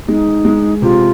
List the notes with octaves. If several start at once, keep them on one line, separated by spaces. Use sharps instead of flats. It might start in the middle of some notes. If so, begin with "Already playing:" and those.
G#3 D#4
G#3
C3 F4